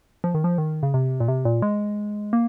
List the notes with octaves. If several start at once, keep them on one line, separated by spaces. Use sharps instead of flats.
F3
D#3
F3
D#3
C#3
C3
A#2
C3
A#2
G#3
A#3